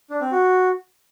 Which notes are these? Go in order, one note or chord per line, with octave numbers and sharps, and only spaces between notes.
D4
C4
F#4